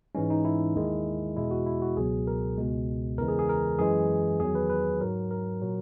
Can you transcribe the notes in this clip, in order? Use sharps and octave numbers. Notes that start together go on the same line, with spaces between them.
G#2 E3 G#3 C#4
D#4
E4
D#2 D#3 G#3
E2 B2 G#3 E4
F#4
E4
F#4
C#2 B2 F#3 G#4
A#4
C#2 B2 G#3
E2 C#3 E3 G#3 A#4
G#4
G#4
A#4
F#2 E3 G#3 G#4
E2 D#3 F#3 G#4
B4
B4
G#2 F#3 A#4
A#4
A#2 F#3